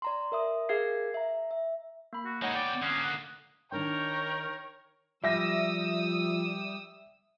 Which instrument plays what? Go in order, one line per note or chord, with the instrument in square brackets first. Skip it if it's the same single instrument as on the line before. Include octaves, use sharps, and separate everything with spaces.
[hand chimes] D5 A#5 C6
A#4 E5 D#6
G#4 A#4 F5 G#6 C7
E5 A#5
E5
[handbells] A#3 B5
[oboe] F#4
[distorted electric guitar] G#3 A#3 [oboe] D#4 [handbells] C#5 F#5
[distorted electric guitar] B2 G5 [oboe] D5
[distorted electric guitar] D3 A#3 [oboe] C#4 [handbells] D#6 F#6 C7
[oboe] F#5
[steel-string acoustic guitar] D#3 D4 D#4 [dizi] A#4 [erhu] C#5 [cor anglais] G5
[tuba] F3 [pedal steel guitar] G3 [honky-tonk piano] E5 A#6 [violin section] D#6 E6